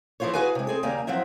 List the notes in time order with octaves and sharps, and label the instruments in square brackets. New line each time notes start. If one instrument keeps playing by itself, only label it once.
[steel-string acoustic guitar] E3 F3 E4 F4 C5 C#5
F#4 G#4 B4 F5 G#5
C3 G#3
C4 G#4 A4
D#2 C#3 G3 A#3 G#5 A#5
F3 F#3 C4 E4